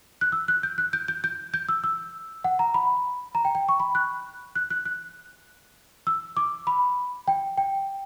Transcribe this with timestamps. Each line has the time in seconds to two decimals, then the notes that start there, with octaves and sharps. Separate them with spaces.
0.21 F#6
0.32 E6
0.48 F#6
0.63 G6
0.78 F#6
0.93 G6
1.08 G6
1.24 G6
1.54 G6
1.69 E6
1.84 E6
2.44 F#5
2.59 A#5
2.74 B5
3.35 A#5
3.45 G5
3.55 G5
3.69 C#6
3.80 B5
3.95 F#6
4.56 F#6
4.70 F#6
4.85 F#6
6.07 E6
6.37 D6
6.67 B5
7.28 G5
7.58 G5